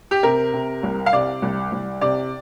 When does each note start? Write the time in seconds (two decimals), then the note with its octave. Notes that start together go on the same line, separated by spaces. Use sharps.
0.11 G4
0.23 C3 A#4
0.53 C3
0.83 C2
1.06 F5
1.13 C3 D5
1.42 C2
1.72 C2
2.01 C3 D5